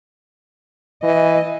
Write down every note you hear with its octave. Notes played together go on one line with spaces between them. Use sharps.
E3 D#5